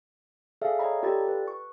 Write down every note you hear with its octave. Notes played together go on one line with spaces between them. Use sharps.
G#4 A4 D5 E5 F5
C#5 D#5 A#5 B5
F4 G4 A4 D5 B5 A6
B4
C#6